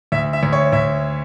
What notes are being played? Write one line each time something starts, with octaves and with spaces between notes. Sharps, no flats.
D2 E5
E5
D2
C#5
D2 E5